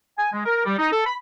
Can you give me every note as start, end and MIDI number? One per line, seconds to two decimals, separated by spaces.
0.18 0.30 80
0.33 0.41 56
0.45 0.63 70
0.65 0.74 55
0.79 0.88 63
0.92 1.02 69
1.06 1.14 83